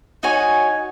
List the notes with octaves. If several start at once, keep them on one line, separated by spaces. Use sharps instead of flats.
D#4 F#4 C#5 G#5